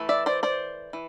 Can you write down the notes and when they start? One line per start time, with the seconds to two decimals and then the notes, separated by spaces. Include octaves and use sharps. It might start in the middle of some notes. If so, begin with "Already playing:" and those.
Already playing: E3 A3
0.09 D5 E5
0.26 C5 D5
0.43 C5 D5
0.93 E3